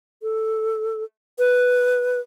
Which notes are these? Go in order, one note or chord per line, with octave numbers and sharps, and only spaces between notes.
A4
B4